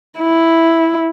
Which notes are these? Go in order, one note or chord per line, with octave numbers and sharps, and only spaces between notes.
E4